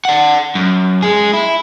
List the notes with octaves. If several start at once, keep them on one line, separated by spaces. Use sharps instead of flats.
D5 F#5
F#2
G#3 G#4
E4